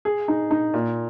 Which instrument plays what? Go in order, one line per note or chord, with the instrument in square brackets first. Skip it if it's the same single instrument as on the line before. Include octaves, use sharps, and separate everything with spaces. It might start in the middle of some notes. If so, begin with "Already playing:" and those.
[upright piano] G#4
D#4
D#4
A#2